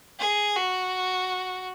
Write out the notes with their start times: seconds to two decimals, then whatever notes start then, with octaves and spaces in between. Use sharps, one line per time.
0.19 G#4
0.56 F#4